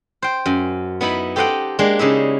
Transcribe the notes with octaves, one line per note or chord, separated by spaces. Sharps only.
C5 G5
F#2
B3 D#4 E4 B5
G4 A4 C5 D#5 F#5 G5
G#3 A#3 D4 G4
C#3 D#4 E4 E5